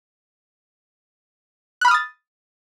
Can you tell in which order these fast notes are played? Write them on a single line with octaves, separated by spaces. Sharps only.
F#6 B5 F6 D#6 A6